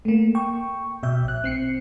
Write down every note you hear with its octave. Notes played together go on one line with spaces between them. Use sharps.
A3 A#3
G5 C#6
B2 E5 G6
A#1 F#6
C4 C7 C#7